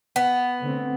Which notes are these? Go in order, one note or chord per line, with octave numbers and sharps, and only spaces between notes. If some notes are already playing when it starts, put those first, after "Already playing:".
B3
D3 A3 C4